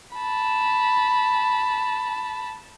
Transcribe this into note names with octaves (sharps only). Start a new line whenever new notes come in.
A5 B5